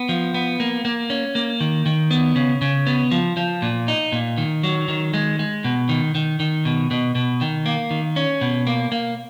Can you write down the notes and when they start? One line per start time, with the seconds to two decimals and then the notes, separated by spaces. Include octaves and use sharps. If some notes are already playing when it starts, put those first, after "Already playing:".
Already playing: B3
0.09 F3
0.34 B3
0.60 A#3
0.85 A#3
1.10 C#4
1.35 A#3
1.61 D#3
1.86 D#3
2.11 B3
2.36 C#3
2.61 C#3
2.87 B3
3.11 F3
3.37 F3
3.62 A#2
3.88 D#4
4.12 A#2
4.38 D#3
4.63 F#3
4.88 D#3
5.14 G#3
5.39 G#3
5.64 B2
5.89 D#3
6.15 D#3
6.40 D#3
6.65 B2
6.91 B2
7.15 B2
7.41 D#3
7.66 A#3
7.91 D#3
8.16 C#4
8.41 B2
8.67 A#3
8.92 A#3